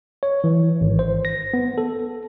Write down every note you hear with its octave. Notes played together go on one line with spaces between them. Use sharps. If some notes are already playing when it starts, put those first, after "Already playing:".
C#5
E3
G#1
C5
A#6
B3
A4